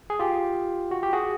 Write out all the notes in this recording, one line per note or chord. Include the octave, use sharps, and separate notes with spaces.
G#4
F4 G4
F#4
G4
F#4 G#4